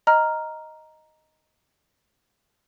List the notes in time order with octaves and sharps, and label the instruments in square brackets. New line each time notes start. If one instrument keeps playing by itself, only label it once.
[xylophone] D#5 A#5 F6